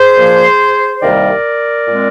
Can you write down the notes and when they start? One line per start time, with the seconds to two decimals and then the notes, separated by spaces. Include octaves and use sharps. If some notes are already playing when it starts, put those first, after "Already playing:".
Already playing: G#4 C5
0.15 A#2 F3 A#3
1.01 C2 C3 D#3 G3 A#3 A#4 D5
1.87 A#2 G#3 C4